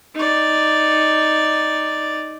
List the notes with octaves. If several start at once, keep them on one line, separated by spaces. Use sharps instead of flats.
D#4 D5